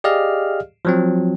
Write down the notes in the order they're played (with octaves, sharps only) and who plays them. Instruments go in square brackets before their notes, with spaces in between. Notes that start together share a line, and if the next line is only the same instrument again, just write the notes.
[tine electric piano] G4 G#4 D5 D#5 F5 F6
F3 F#3 C4